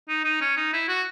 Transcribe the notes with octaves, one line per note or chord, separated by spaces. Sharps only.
D#4
D#4
C#4
D#4
E4
F#4